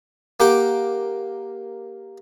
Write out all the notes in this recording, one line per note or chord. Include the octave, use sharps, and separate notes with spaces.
A#3 G4 F#5 G5 D6